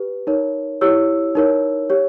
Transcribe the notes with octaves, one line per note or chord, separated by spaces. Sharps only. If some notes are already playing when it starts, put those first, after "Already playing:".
Already playing: G4 B4
D#4 A#4 C#5
E4 G4 C#5 E6
D#4 A#4 C#5
G4 C#5